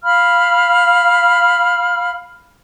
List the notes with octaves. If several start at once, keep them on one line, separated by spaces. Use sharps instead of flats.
F5 B5 F6